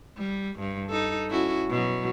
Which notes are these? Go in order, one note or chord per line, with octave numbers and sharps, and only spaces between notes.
G3
G2
D#4 A4
C#4 E4 F#4
B2 F#3